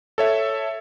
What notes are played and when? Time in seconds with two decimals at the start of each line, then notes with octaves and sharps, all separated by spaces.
0.18 A4 C#5 E5